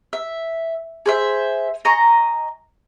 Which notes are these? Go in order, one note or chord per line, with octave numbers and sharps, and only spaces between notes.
E5
G#4 C5 E5
D#5 G#5 A#5 C#6